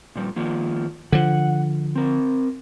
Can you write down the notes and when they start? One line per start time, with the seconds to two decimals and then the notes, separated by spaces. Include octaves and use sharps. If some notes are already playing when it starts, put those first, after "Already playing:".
0.16 A#2 F3 G3
0.36 D#3 F3 A#3
1.12 D3 F3 F#5
1.95 C4 A#4